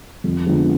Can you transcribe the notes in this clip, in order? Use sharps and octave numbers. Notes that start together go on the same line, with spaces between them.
F2
D3 F3 G#3 B3